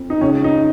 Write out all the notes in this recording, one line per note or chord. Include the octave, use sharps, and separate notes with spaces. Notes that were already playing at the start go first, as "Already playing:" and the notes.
Already playing: F2
D#4
C#2 C#4
D#4